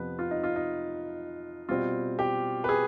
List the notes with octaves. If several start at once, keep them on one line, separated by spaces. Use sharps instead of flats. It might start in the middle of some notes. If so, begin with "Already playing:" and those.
Already playing: F2 C3 F3 B3 B4
F4
D#4
F4
D#4
B2 G3 C4 F4
G4
B4
G#4